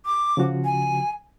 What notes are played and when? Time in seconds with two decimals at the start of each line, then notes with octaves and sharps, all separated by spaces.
0.05 D6
0.37 C#3 F3 F#4
0.65 G#5